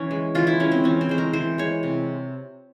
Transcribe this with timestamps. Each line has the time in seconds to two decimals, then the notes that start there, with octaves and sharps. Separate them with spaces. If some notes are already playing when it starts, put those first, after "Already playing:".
Already playing: E3 C#4
0.11 G#3
0.35 E3 F4
0.47 E4
0.60 G#3 C#4
0.72 C4
0.84 E3 C#4
1.01 C4
1.09 G#3 C5
1.18 A#4
1.33 E3 C5
1.58 G#3 C#5
1.83 C3